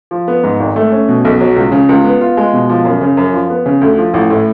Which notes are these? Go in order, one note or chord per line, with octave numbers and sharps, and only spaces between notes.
F3
B3
G#2
G#1
A3
C#4
B2
B1
F#3
C#2
C#3
C#2
B3
F4
G#3
B2
F3
F#2
C#3
F#2
F3
B3
C#3
D2
F3
A1
A2